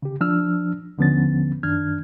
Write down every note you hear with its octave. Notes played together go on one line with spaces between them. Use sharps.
C#3 G4
F3 D4 E6 F6
D#2 D3 F3 B3 C#4 A6
F#2 D#3 D4 F6 G#6